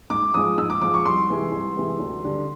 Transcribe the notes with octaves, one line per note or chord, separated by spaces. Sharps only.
G#2 D6
F3 G#3 D#6
G#2 E6
D6
F3 G#3 D6
C#6
C2 C6
C3 E3 G#3
C2
C3 E3 G#3
D2
D3 G3